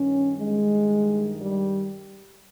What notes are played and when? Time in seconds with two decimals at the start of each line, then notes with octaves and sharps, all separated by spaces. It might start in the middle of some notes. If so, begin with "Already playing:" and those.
Already playing: G2 D#3 C#4
0.38 G#3
1.40 G3